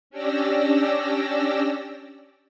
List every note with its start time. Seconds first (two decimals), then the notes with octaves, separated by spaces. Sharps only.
0.10 C#4 D4 G4 D5 E6 A#6